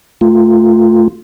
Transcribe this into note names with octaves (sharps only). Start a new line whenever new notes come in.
A3 F4